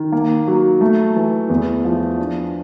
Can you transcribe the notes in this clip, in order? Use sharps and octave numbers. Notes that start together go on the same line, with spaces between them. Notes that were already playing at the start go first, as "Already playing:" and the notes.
Already playing: D#3
A#3
F#3
A3
E3
E2
F3
D4